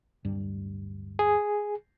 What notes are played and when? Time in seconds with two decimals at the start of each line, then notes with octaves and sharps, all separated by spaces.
0.25 D1 G2 G3
1.19 G#4